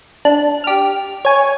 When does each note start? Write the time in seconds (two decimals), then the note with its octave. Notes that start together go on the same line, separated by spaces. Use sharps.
0.25 D4
0.64 G4 F6
1.25 C#5 G#5